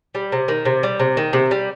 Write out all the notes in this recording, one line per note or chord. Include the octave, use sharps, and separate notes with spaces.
G3
C3
D#3
C3
G3
C3
D#3
C3
G3